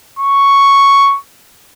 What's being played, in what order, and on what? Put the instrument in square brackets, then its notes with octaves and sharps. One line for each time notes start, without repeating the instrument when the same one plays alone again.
[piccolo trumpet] C#6